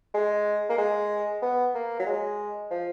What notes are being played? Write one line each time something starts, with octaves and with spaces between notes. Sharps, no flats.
G#3
A#3
G#3
B3
A#3
F#3
G#3
F3